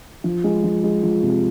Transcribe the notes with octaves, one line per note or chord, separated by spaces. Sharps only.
F3
G#3
F3
G#3
F3
C3